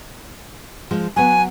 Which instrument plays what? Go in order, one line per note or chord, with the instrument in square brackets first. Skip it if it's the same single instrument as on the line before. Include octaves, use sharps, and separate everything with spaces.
[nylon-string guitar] F3 G#3
[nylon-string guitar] F#3 B3 [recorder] G#5